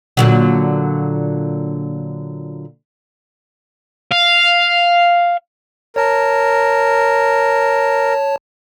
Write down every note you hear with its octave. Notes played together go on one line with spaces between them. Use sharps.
A#2 D3 F#3
F5
A#4 C#5 A5